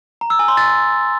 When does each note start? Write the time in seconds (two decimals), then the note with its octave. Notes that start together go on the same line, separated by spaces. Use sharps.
0.21 A#5
0.30 E6
0.39 G#5
0.48 C6
0.57 A6